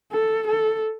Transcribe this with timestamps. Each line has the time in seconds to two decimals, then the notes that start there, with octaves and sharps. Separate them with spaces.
0.12 A4
0.47 A4